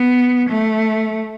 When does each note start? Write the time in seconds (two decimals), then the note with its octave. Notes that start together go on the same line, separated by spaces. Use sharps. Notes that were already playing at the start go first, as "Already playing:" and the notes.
Already playing: B3
0.49 A3